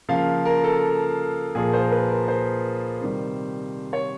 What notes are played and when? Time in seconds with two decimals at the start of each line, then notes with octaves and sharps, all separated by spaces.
0.09 C#3 F3 A#3 F5
0.45 A#4
0.64 A4
1.55 A#2 F3 A#3 G#4
1.73 C5
1.82 A#4
1.92 B4
2.10 A#4
2.28 C5
3.01 C3 D#3 G3
3.93 C#5